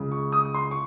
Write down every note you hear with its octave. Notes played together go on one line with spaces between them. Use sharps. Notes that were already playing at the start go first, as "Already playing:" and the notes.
Already playing: C#2 C#3
C#6
D#6
C6
C#6